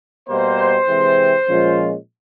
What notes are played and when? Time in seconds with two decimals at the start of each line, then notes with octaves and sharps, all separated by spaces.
0.29 B2 G3 A#3 C5
0.88 C3 E3 G#3 C4
1.47 A#2 F3 G#3 C#4 F4